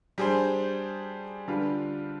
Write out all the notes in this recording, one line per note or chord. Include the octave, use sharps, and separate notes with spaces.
G3 D4 G#4 C5
D3 G3 D4 F4 B4